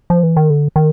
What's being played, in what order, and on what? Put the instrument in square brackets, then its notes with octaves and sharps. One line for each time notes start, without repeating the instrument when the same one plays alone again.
[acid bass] F3
E3
D#3
D3
D#3